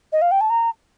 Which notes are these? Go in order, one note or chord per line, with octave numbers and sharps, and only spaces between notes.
D#5
F5
G5
A5
A#5